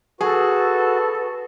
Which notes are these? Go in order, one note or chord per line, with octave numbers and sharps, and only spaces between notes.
F#4 G#4 A4 B4